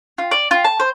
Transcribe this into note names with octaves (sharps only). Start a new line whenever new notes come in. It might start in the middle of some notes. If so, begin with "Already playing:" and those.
F4
D5
F4
A5
C5